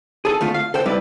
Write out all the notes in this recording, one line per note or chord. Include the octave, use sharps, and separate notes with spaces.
G#4 A4
D2 A3 F4
F5
A4 C5 G5
C2 G3 E4 B4 D5